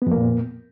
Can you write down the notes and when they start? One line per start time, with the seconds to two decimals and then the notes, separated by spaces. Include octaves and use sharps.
0.02 B3
0.07 F2
0.11 A#3
0.16 A#2